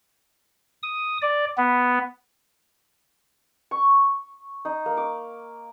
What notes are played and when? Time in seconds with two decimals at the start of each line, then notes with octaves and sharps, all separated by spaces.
0.83 D#6
1.22 D5
1.57 B3
3.71 C#6
4.65 D#4
4.86 A#3
4.97 D6